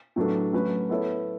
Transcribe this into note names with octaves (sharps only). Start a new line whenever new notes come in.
A2 F#3 B3 D4 A4
F#3 A3 C#4 F#4 B4
B3 E4 A4 C#5